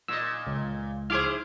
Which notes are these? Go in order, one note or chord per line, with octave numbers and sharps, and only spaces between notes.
A#2 D#5 E6
C#2
E4 G#4 C5 D6 F6